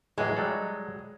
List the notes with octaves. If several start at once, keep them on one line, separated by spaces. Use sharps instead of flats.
A2 E3 F#3 G#3
F#3 G3 A4